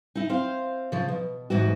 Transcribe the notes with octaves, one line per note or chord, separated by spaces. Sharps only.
D#4 E4
C4 C5 F5
C#3 F3
B2
E2 G#2 B3 E4 F#4